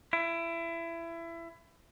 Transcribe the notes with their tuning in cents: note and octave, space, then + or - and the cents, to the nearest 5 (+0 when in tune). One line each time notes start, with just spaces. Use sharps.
E4 +25